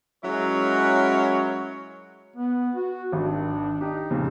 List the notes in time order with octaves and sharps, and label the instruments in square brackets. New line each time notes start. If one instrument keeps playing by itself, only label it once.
[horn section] F#3 G#3 C#4 E4 A#4 C#5
[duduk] B3
F#4
[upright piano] G#1 D#3 [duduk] D4
[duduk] D#4 [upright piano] G4
[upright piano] F2 A#2 C#3